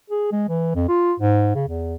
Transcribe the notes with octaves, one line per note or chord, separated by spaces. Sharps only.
G#4
G#3
E3
F2
F4
G#2
C#3
E2